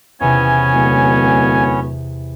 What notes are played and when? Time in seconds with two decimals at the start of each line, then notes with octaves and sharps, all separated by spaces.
0.20 E2 C3 B3 C#4 E4 C#5 G#5
0.73 D1